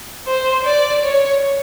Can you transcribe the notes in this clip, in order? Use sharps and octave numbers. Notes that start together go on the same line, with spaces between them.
C5
D5
C#5